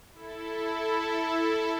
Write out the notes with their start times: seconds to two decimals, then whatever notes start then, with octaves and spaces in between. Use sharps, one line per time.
0.12 E4 A4